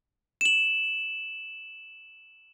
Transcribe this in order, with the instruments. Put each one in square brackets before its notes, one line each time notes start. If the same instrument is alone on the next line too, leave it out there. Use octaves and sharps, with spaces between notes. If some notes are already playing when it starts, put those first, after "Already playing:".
[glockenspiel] E7 F#7